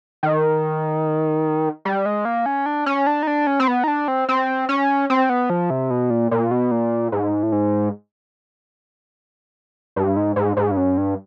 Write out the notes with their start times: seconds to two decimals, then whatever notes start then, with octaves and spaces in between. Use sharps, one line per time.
0.23 D#3
1.85 G3
2.06 G#3
2.25 A#3
2.46 C#4
2.66 D4
2.86 C#4
3.07 D4
3.23 D#4
3.27 D4
3.47 C#4
3.60 C4
3.68 B3
3.84 D#4
3.88 D4
4.08 C4
4.29 C4
4.69 C#4
5.10 C4
5.30 B3
5.50 F3
5.70 C3
5.90 B2
6.10 A#2
6.31 A#2
6.51 B2
6.71 A#2
7.12 G#2
7.43 A2
7.52 G#2
9.96 G2
10.16 G#2
10.36 G#2
10.57 G#2
10.71 G2
10.77 F#2
10.98 G2